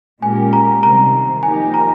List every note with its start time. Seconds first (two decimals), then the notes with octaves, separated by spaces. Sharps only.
0.22 A#2 G#3 C#4 G4 A#4 G#5
0.53 A#5
0.83 C3 D#3 G3 C4 A#5
1.43 F3 A#3 D#4 G4 A#4 G#5
1.74 A#5